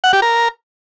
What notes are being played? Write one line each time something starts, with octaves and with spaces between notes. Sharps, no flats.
F#5
G4
A#4